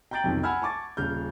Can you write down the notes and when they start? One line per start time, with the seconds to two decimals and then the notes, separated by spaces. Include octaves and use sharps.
0.11 G5 A#5 G6 A6 D7 F#7
0.24 B1 F2 C3 D#3
0.43 F#5 G#5 B5 E6 F6 G#6
0.62 A5 C#6 D6 A6
0.97 D#1 C#3 F6 G6